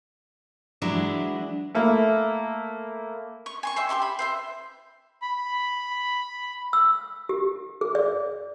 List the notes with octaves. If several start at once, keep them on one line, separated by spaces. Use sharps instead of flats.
E3 F#3 G#3 D4 E4
A3 A#3 E4
C#6
G#5 C6 C#6
C5 C#5 E5 G5
G4 B5 C6 D6
B5
C5 E5 C6
B5
E6
G4
G#4
D5